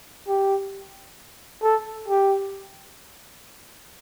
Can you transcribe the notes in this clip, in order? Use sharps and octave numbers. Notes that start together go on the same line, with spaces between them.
G4
A4
G4